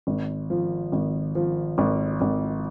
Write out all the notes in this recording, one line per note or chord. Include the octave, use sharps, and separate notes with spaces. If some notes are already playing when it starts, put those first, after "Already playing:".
G#1
F3
G#1
F3
G#1
G#1